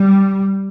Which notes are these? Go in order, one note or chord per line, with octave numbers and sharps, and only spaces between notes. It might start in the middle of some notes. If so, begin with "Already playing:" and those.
Already playing: G3